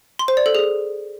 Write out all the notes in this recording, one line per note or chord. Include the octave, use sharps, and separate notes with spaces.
C6
C5
D5
A4
G#4